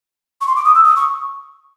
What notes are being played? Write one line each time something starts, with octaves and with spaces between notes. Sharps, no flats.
C#6
C6
D6
D#6
E6
D#6
C#6